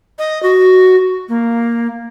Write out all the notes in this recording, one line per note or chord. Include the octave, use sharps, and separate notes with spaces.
D#5
F#4
A#3